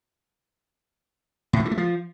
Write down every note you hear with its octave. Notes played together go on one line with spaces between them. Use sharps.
A2
F#3
E3
A3
F3